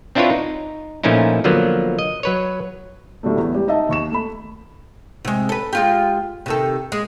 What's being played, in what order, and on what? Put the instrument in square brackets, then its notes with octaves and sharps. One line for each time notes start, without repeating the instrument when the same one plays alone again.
[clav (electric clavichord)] C4 D4 E4 F4 B4 C#5
D#4
A#2 F3 A3 C#4 D#4 E4
D3 F3 F#3 A#3 B3
D#5
F#3 B4 C#5
[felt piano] A2 D3 F#3 G3 A3
E2
G3
D#4 D#5 E5 A5
D#2 C#6 E7
A3 B5
[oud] C3 G#3
A4 B4
G#3 F4 G4
C3 D#3 A4
G#3